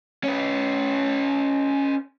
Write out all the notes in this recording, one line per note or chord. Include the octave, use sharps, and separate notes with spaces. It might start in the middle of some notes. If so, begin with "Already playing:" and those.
C#4 B4